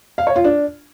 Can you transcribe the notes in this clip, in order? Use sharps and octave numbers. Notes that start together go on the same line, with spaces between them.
F5
C#5
F4
D4